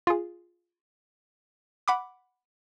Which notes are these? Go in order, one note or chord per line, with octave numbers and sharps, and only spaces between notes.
F4 G#4
F#5 B5 D6